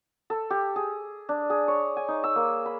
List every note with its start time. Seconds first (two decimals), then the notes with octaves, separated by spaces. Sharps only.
0.30 A4
0.50 G4
0.76 G#4
1.29 D4
1.50 G#4
1.68 C#5
1.97 G#5
2.08 D#4
2.24 E6
2.36 A#3
2.66 B5